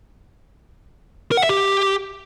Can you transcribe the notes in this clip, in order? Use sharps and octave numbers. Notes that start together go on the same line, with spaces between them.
A#4
F#5
E5
G4